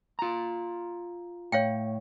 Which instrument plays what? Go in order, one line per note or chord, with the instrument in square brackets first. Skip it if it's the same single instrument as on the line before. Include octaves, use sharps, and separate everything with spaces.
[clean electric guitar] F4 A#5
[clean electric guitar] A2 [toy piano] C#5 F5 G5